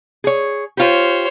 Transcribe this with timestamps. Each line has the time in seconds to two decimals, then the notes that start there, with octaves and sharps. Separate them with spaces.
0.24 G#4 C#5
0.77 F4 G4 C5 C#5